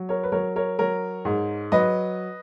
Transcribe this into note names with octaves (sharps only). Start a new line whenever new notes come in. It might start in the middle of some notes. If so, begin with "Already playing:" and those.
Already playing: F#3
A#4 C#5
B4
F#3 A#4 C#5
A#4 C#5
F#3 A#4 C#5
G#2
F#3 B4 D#5